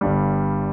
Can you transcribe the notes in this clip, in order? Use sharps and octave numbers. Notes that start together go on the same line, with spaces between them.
G1 G2 G3